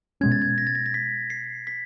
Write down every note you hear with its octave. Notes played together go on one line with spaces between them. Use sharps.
B2 G#3 C#4 G#6
A6
G#6
A#6
A6
A#6
A#6
B6
C7
B6